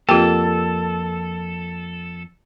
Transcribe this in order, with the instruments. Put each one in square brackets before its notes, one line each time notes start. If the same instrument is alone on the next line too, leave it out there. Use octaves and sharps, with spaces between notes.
[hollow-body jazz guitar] F2 A#3 [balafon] F4 G4 G5 [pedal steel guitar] A4